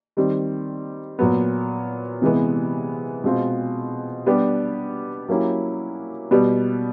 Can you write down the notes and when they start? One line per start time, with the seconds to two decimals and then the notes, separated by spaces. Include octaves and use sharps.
0.17 D#3 G3 C4
1.19 A#2 F#3 B3
2.22 C3 E3 G#3 B3
3.24 B2 G#3 C4 F4
4.26 G3 B3 D4 G4
5.28 F#3 A#3 C#4 E4 G4
6.31 B2 G3 B3